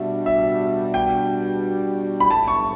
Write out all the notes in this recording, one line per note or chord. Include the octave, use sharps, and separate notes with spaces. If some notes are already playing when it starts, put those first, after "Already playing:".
Already playing: B2 G3 D4 F#4 E5
E5
G5
B5
G1 F#2 D3 A3 A5
C#6